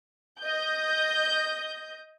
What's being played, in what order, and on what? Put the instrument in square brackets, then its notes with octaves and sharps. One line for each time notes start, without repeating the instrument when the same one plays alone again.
[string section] D#5 G6